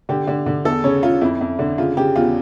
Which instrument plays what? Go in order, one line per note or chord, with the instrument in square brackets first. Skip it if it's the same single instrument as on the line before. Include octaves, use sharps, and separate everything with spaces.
[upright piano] D3 G4
D3
D3
E2 A4
C#3 C#5
C#3 F4
F2 E4
F2
D3
C#3 F4
C#3 G4
E2 F4